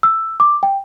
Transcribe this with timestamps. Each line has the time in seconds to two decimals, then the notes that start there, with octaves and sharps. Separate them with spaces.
0.03 E6
0.40 D6
0.63 G5